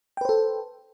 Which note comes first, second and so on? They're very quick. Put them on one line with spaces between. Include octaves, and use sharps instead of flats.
G5 B4 C5 A4